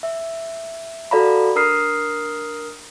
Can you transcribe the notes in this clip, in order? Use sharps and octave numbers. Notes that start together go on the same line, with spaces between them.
E5
F#4 A4 D5 F5 A#5 B5
D4 A#4 A#5 D#6 F6 C7